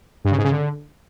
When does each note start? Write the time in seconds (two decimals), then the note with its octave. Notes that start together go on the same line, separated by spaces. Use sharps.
0.24 G2
0.31 C#3
0.38 G#2
0.44 C#3
0.51 D3